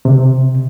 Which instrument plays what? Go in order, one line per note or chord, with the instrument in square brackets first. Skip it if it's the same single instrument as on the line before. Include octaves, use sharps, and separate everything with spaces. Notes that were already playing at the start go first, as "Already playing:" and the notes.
[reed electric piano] C3